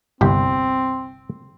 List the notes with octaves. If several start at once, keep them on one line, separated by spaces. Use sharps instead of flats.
G1 C2 C4 G4